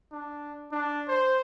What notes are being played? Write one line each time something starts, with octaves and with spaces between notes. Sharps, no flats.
D4
D4
C5